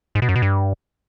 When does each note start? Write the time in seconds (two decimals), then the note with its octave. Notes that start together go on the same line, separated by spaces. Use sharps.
0.15 G#2
0.22 B2
0.29 F#2
0.35 B2
0.42 G2